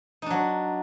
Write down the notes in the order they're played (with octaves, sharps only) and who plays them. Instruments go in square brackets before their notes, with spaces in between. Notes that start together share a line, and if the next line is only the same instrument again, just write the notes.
[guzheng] D#4
D4
F#3